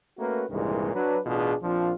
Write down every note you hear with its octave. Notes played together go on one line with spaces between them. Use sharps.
A3 A#3 C#4 F#4 A#4 B4
C2 G2 A#2 D#3 E3 G#3
F#3 D4 B4
A1 B2 D4 F4 G#4
A#1 F3 C4 D4 F4